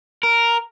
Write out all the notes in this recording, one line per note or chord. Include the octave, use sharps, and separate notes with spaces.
A#4